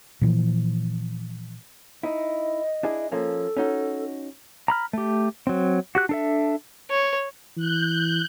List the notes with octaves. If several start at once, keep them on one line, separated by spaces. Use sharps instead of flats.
A#2 E3 F3
D#4 E4 D#5
D4 E4 G#4
F3 A#3 C#4 A4
C#4 D#4 F#4
A#5 B5 F6
A3 G4
F#3 C4
F#4 G4 F#6
D4 A4 E5
C#5
E3 F#6 G6